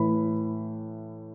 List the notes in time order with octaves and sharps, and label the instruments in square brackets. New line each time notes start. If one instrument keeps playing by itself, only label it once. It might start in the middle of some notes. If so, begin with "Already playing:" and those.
Already playing: [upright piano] A2 E3 B5